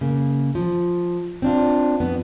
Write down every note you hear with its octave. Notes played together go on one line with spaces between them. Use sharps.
C#3 A#3
F3
C4 D4 F4
F2 B3